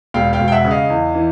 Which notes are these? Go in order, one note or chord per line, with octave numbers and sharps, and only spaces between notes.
E1 F5 G5
F5 G5
E1
G5
E5 F#5
C#3
D#5 F5
E2
E3